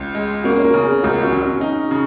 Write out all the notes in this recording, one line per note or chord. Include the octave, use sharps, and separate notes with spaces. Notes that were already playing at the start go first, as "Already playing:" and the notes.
Already playing: C#2 C#4
G#3
A#3 C#4 F#4
C#5
F#4 A#4
C#3
G#4 C#5
C#2 F#4 A#4
C#4 F#4
F#3
C#4
D#4
C#3